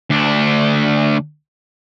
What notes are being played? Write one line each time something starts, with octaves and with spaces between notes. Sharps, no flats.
D2 D4